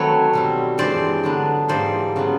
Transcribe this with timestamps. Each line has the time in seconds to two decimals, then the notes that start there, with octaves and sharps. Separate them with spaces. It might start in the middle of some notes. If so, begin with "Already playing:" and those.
Already playing: D#3 F#3 A3 C4 B4 C#5
0.33 B2 G3 C4
0.78 G2 E3 G#3 C5 D5
1.24 D3 F#3 B3 D4
1.68 G#2 E3 G3 A#3 C5 D5
2.16 C#3 F#3 B3